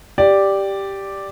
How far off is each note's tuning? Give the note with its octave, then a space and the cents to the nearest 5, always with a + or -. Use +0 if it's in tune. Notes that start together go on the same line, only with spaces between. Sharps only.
G4 +0 D5 +0